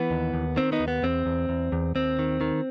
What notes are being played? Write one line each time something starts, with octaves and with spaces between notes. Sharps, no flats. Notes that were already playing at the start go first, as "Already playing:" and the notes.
Already playing: E3 B3
D#2
D#2
D#3 C4
B3 D#4
D#2
B3
E2 C4
E2
E2
E2
D#2 C4
D#3
D#3